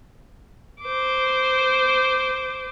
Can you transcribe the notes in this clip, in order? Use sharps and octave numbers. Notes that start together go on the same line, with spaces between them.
C5 D6